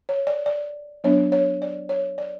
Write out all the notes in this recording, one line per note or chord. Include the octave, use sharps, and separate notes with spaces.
C#5
D5
D5
F#3 B3 D4 C#5
C#5
D5
C#5
D5